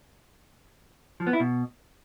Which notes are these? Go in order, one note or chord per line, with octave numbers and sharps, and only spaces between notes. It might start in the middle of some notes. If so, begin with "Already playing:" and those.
F3
B3
E4
B2